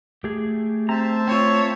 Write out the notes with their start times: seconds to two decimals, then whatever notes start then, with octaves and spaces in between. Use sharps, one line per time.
0.24 A3 G4 G#4
0.89 C4 C5 E5 A5 A#5
1.27 C4 F4 C#5